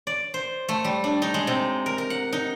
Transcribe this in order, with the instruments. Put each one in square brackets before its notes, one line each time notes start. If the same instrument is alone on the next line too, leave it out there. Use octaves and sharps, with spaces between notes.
[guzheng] D5
C5
A3
G3
D4
D#4
G#3
C3
A#4
A#4
F#5
D#4